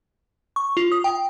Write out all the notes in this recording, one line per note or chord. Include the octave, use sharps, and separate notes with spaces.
C#6
F4
D#6
G5